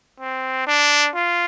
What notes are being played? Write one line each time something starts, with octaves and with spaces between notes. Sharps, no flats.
C4
D4
F4